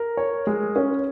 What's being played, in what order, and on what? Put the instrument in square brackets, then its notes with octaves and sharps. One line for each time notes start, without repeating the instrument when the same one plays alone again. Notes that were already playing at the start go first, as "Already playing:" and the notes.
Already playing: [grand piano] A#4
[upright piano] C#5
G#3
C#4